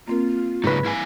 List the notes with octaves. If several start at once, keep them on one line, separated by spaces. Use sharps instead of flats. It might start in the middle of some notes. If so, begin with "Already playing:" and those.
A#3 C4 F4 A#4
G#2 C#3 F#3 D#4 B4
E4 F5 G#5